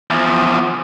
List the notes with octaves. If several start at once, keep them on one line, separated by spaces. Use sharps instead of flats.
E2 F3